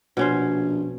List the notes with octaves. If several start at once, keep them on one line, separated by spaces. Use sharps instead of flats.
A#1 B2 C#4 C5